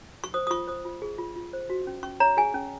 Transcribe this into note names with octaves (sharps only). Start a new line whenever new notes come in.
C#6
C5 D#6
D#6
F4 C#6
C5 D#6
F4
G#4
F4
F4
C5
F#4
C#4
C#4 C#6
C#5 A#5
G#4 G#5
C#4